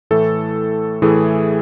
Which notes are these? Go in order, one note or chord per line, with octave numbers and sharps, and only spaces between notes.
A2 E3 A3 A4
A2 E3 A3 G#4